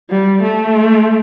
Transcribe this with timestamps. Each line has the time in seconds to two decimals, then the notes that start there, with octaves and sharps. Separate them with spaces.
0.11 G3
0.43 A3